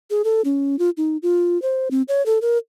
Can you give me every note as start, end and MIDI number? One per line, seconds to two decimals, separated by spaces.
0.10 0.22 68
0.24 0.41 69
0.45 0.79 61
0.79 0.90 65
0.97 1.17 63
1.22 1.60 65
1.62 1.88 72
1.91 2.02 60
2.08 2.24 73
2.26 2.39 69
2.42 2.58 70